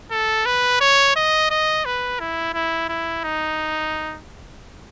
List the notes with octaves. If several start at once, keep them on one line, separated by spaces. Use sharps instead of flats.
A4
B4
C#5
D#5
D#5
B4
E4
E4
E4
D#4